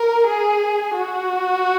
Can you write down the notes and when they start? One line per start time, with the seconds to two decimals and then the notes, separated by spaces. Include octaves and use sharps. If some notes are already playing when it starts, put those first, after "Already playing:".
Already playing: A#4
0.27 G#4
0.94 F#4